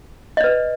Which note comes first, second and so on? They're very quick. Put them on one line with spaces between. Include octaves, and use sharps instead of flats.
D#5 D5 B4